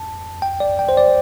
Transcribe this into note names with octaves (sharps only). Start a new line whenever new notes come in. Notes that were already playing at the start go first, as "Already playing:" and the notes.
Already playing: A5
G5
D5
G5
C5
D5